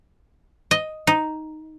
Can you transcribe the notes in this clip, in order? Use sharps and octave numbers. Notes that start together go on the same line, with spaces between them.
D#5
D#4